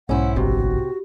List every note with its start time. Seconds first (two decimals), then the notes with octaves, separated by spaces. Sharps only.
0.09 B1 G#2 C#4 E4 C5 F#5
0.36 G1 C3 F#4